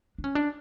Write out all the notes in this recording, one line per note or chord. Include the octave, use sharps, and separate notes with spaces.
D4
C#4
D4